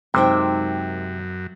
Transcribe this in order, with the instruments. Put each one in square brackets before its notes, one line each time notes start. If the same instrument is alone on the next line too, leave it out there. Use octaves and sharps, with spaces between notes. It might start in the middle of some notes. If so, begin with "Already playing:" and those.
[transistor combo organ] F#2 [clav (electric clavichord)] C3 [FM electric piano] G#3 D#4 [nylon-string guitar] A#4 C5 G5